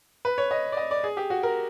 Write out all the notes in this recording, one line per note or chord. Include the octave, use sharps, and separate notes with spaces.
B4
C#5
D#5
D5
D#5
D5
G#4
G4
F#4
A#4